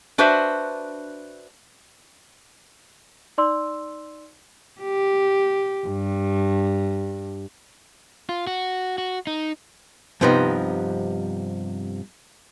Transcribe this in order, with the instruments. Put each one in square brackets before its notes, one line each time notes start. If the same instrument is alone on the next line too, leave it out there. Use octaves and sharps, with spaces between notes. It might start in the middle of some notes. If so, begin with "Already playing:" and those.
[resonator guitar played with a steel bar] D4 F#4 B4 C5 E5
[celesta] D#4 D5 C6 E6
[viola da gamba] G4
G2
[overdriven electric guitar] F4
F#4
F#4
D#4
[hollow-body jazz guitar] G2 C3 F3 B3 C4 D#4